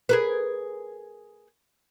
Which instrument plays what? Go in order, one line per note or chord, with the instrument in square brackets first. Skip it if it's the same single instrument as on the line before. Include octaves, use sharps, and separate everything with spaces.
[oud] G#4 A#4 B4